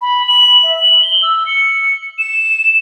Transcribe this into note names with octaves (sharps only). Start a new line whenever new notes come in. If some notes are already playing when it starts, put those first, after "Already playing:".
B5
F#7
E5
F#7
G7
E6
C#7
E7